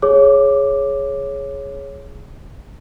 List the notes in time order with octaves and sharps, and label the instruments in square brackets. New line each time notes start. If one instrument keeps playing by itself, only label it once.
[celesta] G#4 C#5 D6